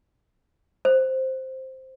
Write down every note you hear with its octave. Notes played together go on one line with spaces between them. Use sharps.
C5